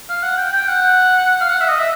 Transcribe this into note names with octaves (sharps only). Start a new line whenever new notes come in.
F5
F#5
G5
G5
F#5
F5
F#5
E5
D#5
E5